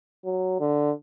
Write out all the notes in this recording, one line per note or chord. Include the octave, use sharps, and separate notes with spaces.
F#3
D3